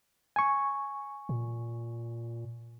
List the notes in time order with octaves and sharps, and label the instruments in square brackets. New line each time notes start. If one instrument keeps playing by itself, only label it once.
[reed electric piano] G#5 C#6
[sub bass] A#2